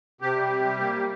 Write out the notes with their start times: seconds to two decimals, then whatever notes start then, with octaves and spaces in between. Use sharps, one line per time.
0.21 C3 G4
0.36 G3
0.51 C3
0.65 G3
0.80 A#3
0.95 G3